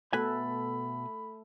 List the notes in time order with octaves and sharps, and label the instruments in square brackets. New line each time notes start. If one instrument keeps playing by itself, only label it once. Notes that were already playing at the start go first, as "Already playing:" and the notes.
[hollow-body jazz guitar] B2 B4 G#5 [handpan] A3 A4 [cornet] B5